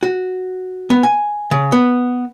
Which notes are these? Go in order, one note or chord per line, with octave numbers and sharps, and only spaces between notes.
F#4
B3
G#5
C#3
B3